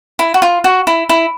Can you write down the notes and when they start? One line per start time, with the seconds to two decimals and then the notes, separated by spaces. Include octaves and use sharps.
0.19 E4
0.34 F#4
0.42 F4
0.64 F#4
0.87 E4
1.09 E4